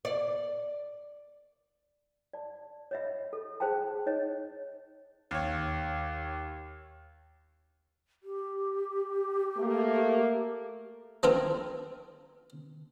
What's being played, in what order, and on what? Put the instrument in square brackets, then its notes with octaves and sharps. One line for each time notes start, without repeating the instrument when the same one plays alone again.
[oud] D5
[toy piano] D5 A5
C#5 D#5 E5
A4
G#4 C5 F5 G5 A5
D#4 C#5 D#5
[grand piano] D#2 C#5
[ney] G4
[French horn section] A3 A#3
[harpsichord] F3 B3 C4 E4 A#4